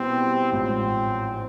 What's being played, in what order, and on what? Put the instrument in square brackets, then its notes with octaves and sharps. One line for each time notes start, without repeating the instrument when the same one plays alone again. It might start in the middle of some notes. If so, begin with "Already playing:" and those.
Already playing: [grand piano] B2 G3 B3 E4 [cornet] C4
[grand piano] A1 G#2 F3 [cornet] C4